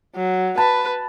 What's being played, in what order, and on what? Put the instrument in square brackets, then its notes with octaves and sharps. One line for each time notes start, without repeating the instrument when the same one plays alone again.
[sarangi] F#3
[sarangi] B4 [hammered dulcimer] A5 B5